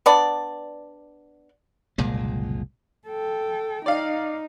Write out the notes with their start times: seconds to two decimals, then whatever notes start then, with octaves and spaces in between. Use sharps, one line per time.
0.06 B3 D4 D5
1.98 F#1 C2 A#2 G#3
3.08 A4 G5
3.86 D#4 D5 F5